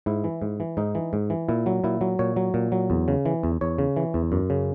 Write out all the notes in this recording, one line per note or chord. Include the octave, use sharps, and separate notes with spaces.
G#2 E4
E3
G#2
E3
G#2 D#4
E3
G#2
E3
A#2 E4
F#3
A#2 E4
F#3
A#2 C#5
F#3
A#2
F#3
E2
C#3
E3
E2
E2 C#5
C#3
E3
E2
F#2
C#3